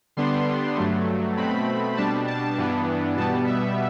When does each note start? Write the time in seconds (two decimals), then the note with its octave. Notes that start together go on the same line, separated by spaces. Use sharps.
0.17 D3 G3 B3 D4 C6
0.77 G2 F#3 A3
1.37 B2 A3 C4 B5
1.97 B2 G3 D4 A5
2.27 A5
2.58 G2 E3 B3 D4
3.17 B2 G3 B3 A5
3.47 E5